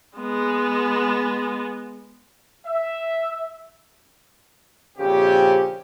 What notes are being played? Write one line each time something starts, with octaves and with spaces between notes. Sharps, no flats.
G#3 B3
E5
A#1 C#3 C4 G4